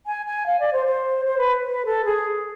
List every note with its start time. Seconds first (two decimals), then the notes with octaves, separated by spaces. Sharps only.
0.06 G#5
0.26 G#5
0.46 F5
0.59 D5
0.73 C5
0.86 C5
1.25 C5
1.38 B4
1.65 B4
1.85 A4
2.05 G#4